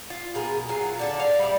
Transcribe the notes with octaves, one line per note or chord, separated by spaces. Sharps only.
F4
B2 G#4 A#4
F#3 F4 G#4
D3 D4 A4
F5
G3 E4 D5